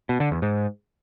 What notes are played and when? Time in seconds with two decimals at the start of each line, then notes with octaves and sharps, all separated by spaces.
0.09 B2
0.20 D3
0.31 E2
0.42 G#2